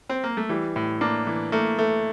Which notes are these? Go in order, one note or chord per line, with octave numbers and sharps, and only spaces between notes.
C4
A#3
A3
E3 G3
A2
A#3 D4
E3
A3 A#3
A3